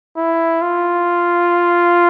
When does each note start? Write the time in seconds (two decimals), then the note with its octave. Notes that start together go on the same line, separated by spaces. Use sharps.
0.17 E4
0.62 F4